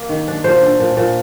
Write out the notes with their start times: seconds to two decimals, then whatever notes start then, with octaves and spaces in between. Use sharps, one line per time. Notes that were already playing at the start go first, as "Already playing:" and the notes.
Already playing: A#3
0.09 D#3
0.28 D4
0.44 A#2 C5
0.62 D4
0.79 A#2
0.97 A#2